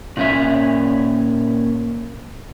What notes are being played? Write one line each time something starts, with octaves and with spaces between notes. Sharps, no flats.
A#2 C#4 E5